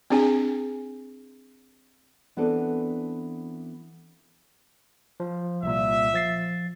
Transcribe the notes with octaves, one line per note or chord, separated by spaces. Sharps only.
C4 D4 G#4 G#5
E3 B3 C4 D4 F#4 A4
F3
C2 A#2 E5
F3 A6 C7